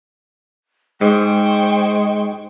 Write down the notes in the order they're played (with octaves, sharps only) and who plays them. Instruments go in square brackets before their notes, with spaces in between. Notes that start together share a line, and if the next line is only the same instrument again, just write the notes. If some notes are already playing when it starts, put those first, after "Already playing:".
[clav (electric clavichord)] G#2 [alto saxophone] G#3 [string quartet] C5 C#6 [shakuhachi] G5